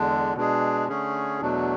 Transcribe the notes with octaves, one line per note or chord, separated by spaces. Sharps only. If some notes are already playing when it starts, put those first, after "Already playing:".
Already playing: E2 D3 G#3 D4
B2 G#3 D4 G#4
D3 A3 C#4 G#4
E2 B2 F#3 A3 D4